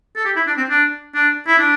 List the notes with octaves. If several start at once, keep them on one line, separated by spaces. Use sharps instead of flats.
A4
G4
E4
D4
C4
D4
D4
E4
D4